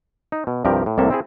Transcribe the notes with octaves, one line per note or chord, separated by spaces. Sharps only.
D#4
B2
C2 G2 C3 F3 G4 A#4
A2
C2 A2 C3 A#3 A4 E5
C4 E4 G#4